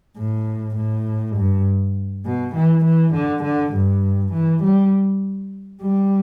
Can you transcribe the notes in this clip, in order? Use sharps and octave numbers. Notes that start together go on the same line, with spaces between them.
A2
A2
G2
B2
E3
E3
D3
D3
G2
E3
G3
G3